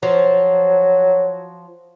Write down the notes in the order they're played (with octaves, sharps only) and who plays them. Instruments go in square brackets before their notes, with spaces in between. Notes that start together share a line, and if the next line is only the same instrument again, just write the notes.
[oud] F3 [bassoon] F#3